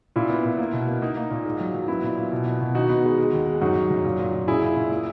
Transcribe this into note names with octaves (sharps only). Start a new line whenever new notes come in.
A#2 E4
B3
A#2
A#3
B2
A#3
A#3 D#4
A#3
A#2
G#2
F#3
F#3
B3 E4
A#2
A#2
B2
B2
B2
D#3 D#4 F#4
B3
G#3
G#3
D#2
G#3
F#2 D#4 F#4
F#2
F#2
A#2
A#2
A#2
A#2 E4 G#4
A#2
A#2
A#3